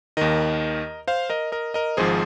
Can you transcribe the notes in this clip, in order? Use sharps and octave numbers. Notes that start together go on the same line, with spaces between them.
D#2 D#3 A#4 D#5
C5 F5
A#4 D#5
A#4 D#5
A#4 D#5
G#1 G#2 F3 G#4 C5